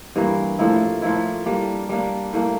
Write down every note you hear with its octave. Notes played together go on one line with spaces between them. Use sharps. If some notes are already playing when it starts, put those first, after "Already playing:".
G2 E3 A#3
A2 F3 A#3 E4
A2 F3 A#3 E4
G3 A#3 D4
G3 A#3 D4
A2 G3 A#3 D4